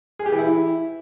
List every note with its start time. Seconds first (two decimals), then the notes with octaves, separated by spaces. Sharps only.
0.19 G#4
0.26 G4
0.32 E3
0.39 E4